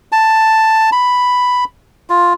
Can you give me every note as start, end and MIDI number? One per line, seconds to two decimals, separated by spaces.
0.12 0.90 81
0.92 1.64 83
2.10 2.33 65